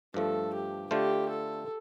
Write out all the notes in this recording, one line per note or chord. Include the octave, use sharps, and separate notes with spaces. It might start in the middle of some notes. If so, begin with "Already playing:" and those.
G2 F3 A3 A4
G4
D3 A3 F4 G4 C5
A4